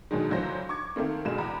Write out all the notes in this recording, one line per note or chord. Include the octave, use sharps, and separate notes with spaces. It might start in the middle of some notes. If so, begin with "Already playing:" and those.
B2 D3 D#3 F#3 G#3
C#2 D3 E3 F#3 C5 A#6
C#6 D6 G#6
D#3 A3 A#3 C4
F1 G2 B2 G#3 E7
E2 A#5 B5